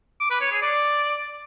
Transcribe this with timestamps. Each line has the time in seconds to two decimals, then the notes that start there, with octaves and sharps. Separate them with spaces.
0.20 D6
0.31 B4
0.41 C#5
0.52 G#4
0.62 D5